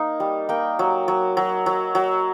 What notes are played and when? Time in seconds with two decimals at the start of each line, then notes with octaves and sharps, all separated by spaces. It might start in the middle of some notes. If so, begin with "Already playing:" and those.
Already playing: A#3 D#4
0.20 G3
0.49 A#3 G5
0.79 F#3
1.08 F#3
1.37 F#3
1.66 F#3
1.95 F#3